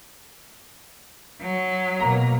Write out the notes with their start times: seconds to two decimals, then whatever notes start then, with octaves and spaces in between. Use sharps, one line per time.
1.41 F#3
2.00 B2 A#3 A#5